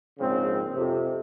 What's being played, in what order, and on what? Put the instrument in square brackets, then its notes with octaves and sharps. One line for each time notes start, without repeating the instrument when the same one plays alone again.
[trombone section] A#1 G#2 C#3 C4
F2 C3